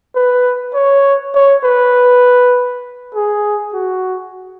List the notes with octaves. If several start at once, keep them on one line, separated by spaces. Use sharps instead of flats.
B4
C#5
C#5
B4
G#4
F#4